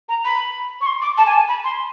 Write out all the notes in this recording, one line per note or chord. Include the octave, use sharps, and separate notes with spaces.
A#5
B5
C#6
C6
D6
A5
G#5
A5
B5
C6